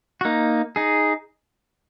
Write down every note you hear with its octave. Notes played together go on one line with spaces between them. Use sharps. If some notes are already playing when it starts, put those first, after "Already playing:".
F#4
A#3 D#4
D#4 G#4